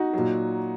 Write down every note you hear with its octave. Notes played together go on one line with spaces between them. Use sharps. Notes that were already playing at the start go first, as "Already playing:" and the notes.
Already playing: D#4 F#4
A#2 F#3